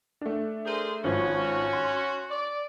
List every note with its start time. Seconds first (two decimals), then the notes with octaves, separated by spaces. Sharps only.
0.21 A3 D4
0.65 G#4 A#4 C5
1.04 G#1 F3 C#4 F#4
1.73 C6
2.31 D5